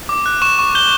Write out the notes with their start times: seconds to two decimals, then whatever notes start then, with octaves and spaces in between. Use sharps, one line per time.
0.09 D6
0.26 F#6
0.42 C#6 E7
0.59 C#6
0.75 G6 G7